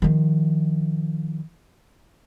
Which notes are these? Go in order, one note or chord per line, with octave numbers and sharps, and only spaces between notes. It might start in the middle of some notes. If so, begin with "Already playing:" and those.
D#3 F3